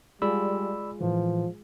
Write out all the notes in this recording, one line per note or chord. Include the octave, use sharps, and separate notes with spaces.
G3 G#3 F4 G#4 D5 B5 E6
A2 E3 F3